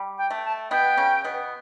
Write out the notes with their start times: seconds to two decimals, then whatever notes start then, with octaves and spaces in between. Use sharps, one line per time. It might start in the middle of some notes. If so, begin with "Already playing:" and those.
Already playing: G3
0.17 G5
0.30 A3
0.44 A5
0.70 B2 B3 G5
0.97 C#3 C#4
1.24 B2 B3